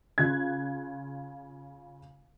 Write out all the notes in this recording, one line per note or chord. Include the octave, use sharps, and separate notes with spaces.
C#3 F4 F#6 G#6